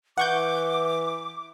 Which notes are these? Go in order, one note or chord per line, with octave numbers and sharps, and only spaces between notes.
E3 F#5 C#6 D6 G6